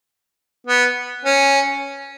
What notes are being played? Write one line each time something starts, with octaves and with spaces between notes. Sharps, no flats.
B3
C#4